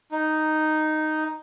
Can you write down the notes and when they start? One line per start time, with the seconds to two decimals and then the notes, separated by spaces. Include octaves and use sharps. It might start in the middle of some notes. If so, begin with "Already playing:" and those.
0.12 D#4